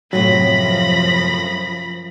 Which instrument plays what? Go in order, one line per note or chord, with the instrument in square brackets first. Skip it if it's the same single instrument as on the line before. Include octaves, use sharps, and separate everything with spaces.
[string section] F#2 F3 A#6 [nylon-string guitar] A2 C3 [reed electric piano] F#3 [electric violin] B5